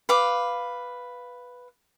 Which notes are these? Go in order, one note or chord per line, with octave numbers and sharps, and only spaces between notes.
B4 F5 D6